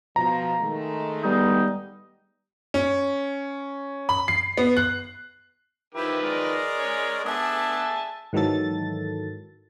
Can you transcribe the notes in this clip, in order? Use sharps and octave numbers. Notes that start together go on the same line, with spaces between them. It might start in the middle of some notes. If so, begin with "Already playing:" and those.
B2 F3 A#5
D#3 G#3 A3
G3 B3 D#4
C#4
B5
C7
B3
F#6
D#3 F3 E4 G4 B4
G#3 A#4 D5
C#4 C#5
B3 D4 G#4 E5 G#5 A5
G#2 D#3 E3 F#3 A4 A6